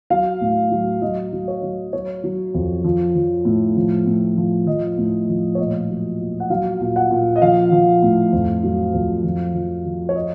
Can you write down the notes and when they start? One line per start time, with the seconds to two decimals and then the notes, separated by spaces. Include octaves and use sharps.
0.10 F#3 F5
0.41 A2
0.71 F#3
1.02 F#3 D#5
1.33 F#3
1.48 C#5
1.63 F#3
1.93 F#3 C#5
2.24 F#3
2.54 F2
2.84 F3
3.15 F3
3.45 A2
3.76 F3
4.06 A2
4.37 F3
4.67 F3 D#5
4.98 A2
5.28 F3
5.55 C#5
5.59 A#2 D#5
5.89 F#3
6.20 A#2
6.40 F#5
6.50 F#3 F5
6.81 A#2
6.96 F#5
7.11 A#2
7.36 D#5
7.42 F3 F5
7.72 F3
8.03 A2
8.33 F2
8.63 F#3
8.94 F2
9.24 F3
9.54 F3
9.85 F3
10.09 C#5
10.16 D#5